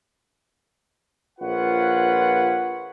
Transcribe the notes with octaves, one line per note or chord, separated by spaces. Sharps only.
A#1 F4 B4 C#5 F#5